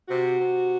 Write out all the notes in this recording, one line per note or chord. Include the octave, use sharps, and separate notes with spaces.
C3 F#4
C3